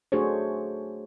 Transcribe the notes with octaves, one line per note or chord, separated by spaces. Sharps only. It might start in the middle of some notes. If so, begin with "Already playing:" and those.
A3 D4 F#4 G#4 C5 C#5